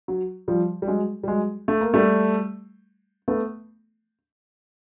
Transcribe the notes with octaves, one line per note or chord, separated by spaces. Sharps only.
F#3
F3 G3
G3
F#3 G#3
G3
F#3 G#3
A3
A#3
G3 A3
A3 B3